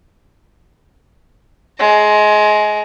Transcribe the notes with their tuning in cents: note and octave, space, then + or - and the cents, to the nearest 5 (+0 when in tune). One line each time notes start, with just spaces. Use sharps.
G#3 +25 A#5 +0